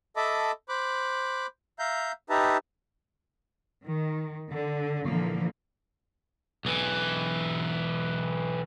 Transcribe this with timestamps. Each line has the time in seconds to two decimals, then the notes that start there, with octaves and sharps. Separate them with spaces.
0.16 A4 D#5 E5 A5 B5 D6
0.69 C5 B5 D6 F#6
1.79 E5 F5 A#5 G6
2.30 D#4 G4 B4 E5 A5 A#5
3.84 D#3
4.51 D3
5.05 A#2 D3 E3 F3 A#3
6.65 B1 E3